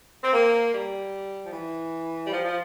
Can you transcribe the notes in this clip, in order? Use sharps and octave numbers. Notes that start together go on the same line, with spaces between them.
C4
A#3
G3
F3
E3
G3
F3
F3